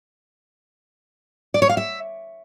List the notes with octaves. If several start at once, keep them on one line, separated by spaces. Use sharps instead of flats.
D5
C#5
F5
E5